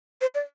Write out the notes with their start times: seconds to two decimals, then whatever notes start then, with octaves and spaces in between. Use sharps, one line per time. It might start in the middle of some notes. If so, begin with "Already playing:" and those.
0.21 C5
0.35 D5